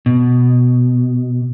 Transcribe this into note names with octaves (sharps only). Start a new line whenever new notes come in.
B2